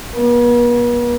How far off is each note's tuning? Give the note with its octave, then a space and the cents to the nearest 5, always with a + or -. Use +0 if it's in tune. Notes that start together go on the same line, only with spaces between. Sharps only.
B3 -45